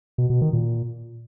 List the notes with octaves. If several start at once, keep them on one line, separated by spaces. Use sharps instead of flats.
B2
B2
D#3
A#2